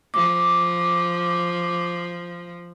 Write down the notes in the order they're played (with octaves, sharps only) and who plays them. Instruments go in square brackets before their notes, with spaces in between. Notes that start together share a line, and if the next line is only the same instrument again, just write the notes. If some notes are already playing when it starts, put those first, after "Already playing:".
[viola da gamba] F3 [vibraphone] D6